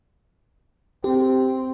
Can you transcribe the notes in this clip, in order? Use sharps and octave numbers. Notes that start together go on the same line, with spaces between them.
C4 G4